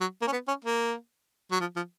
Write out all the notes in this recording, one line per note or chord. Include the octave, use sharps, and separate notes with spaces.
F#3
A#3
C#4
B3
C#4
A#3
F#3
F3
F3